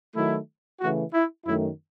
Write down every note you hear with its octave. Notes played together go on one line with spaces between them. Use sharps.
D#3 F#3 A3 E4
C#3 E3 A3 F#4
E4
F#2 D#3 A3 E4